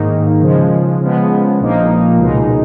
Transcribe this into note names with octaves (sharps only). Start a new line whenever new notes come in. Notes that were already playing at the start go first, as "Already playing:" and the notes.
Already playing: G#2 D#3 A#3 D#4
C#3 F3 G#3
C#3 F3 G#3 B3
A#1 A#2 F3 A#3 D#4
C#2 B2 G#3 D#4